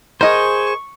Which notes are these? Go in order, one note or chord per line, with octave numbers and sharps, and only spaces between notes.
G#4 A#4 C5 D#5 C#6